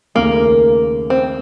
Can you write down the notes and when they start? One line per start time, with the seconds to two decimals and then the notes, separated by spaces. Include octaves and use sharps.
0.15 D#2 C#3 A3 A#3
1.10 C4